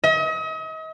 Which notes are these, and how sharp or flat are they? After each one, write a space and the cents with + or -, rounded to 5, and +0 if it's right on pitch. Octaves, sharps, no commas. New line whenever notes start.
D#5 +40